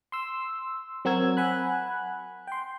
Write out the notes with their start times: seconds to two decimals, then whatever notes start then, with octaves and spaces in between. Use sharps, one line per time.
0.12 C6 E6
1.05 F#3 C4 F#4 A#4 E6 G#6
1.37 F#5 G#5 B5 F#6
2.47 G5 C6